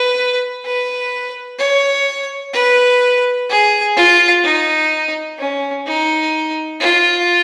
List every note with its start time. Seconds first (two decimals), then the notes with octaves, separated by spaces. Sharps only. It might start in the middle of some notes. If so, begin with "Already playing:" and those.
Already playing: B4
0.65 B4
1.58 C#5
2.53 B4
3.49 G#4
3.96 F4
4.43 D#4
5.39 C#4
5.86 D#4
6.80 F4